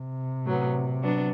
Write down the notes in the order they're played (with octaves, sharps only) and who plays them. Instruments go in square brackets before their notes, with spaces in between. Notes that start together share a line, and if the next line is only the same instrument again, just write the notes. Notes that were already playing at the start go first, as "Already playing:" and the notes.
Already playing: [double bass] C3
[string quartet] A2 F#3 B3
F#3 B3 D4